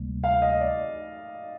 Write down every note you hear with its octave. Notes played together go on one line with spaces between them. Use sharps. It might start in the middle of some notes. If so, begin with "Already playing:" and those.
Already playing: D2 C3 G3 A#3
F5
D#5
D5